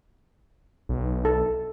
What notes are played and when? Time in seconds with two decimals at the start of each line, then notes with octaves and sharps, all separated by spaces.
0.89 B1
1.25 A4